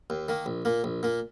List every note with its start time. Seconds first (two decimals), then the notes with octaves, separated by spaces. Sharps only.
0.10 D#2
0.28 D#3 A#3
0.46 A#1
0.65 A#2 A#3
0.84 A#1
1.03 A#2 A#3